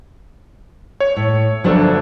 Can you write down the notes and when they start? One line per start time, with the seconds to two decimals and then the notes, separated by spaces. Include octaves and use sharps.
1.00 C#5
1.16 A2
1.64 G1 F3 F#3 A#3 D4 A4